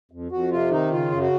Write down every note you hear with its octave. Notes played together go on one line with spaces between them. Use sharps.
F2
F2 F#4
C3 F4
D#3 D#4
C#3 F4
F#2
F#4